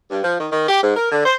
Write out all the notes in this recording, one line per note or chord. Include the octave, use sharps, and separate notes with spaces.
G2
F3
D#3
D#3
G4
G#2
A#4
D3
C5